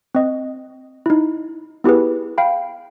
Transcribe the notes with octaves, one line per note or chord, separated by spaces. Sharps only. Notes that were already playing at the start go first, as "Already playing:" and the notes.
C4 D#5
D#4 E4
B3 E4 G4 G#4 B4
F5 G5 B5